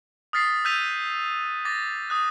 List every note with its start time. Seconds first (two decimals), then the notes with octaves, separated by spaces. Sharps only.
0.33 D#6 F6 A6 B6 C7
0.65 E6 F#6 G6 B6 D#7 F7
1.65 D6 A6 A#6
2.10 D#6 F#6